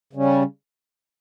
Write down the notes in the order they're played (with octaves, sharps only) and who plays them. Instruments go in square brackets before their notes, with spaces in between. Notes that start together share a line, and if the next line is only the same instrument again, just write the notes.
[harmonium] C#3 G3 C#4